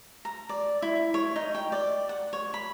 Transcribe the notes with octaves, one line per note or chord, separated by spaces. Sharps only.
A#5
D5
E4
C#5
D#4
G5
D5
F#5
C#5
B5